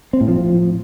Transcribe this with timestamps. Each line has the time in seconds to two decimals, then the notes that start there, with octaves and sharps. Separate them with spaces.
0.13 C4
0.21 A2
0.28 F3